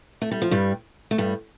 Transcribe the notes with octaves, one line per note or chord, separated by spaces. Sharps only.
A3
G3
F3
G2 G3
A3
G2 G3